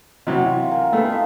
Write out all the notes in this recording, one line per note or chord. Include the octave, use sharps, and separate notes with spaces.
C3 E3 F#3 F#4
F4
G4 A#4 G#5
A3 B3 A4 F5 A5
D#4 F4 E5